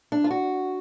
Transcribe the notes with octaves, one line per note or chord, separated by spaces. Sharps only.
D4
F4
F#4